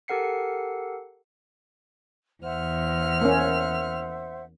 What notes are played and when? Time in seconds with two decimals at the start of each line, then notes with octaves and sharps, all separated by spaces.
0.08 G4 A4 A#4 F#5 C7 C#7
2.43 E2 C5 E5 F#5 F6
3.21 A#3 C#4